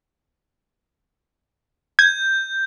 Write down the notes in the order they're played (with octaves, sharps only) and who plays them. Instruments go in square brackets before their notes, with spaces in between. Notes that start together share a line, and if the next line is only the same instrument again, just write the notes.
[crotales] G6 [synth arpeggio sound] G#6